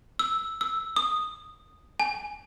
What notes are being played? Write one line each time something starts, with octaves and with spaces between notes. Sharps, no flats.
E6
E6
D#6
G#5